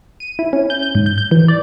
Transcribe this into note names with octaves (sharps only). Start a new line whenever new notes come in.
D#7
E4
C#4
G6
G6
G#2
G6
G6
E3
D5